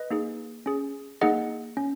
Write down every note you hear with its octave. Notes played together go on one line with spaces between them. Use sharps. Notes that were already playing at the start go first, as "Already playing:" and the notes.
Already playing: B4 D#5
A#3 D#4 G#4
C#4 G#4
A#3 D#4 G#4 D#5 F#5
C#4